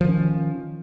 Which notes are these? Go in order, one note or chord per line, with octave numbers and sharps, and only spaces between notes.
D#3 F3 C#4